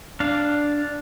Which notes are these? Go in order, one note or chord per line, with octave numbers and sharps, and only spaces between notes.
D4 F5